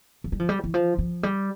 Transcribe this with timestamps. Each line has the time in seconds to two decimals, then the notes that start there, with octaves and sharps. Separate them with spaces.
0.24 F3
0.32 G3
0.40 F3
0.49 G3
0.64 E3
0.74 F3
0.99 F3
1.23 G3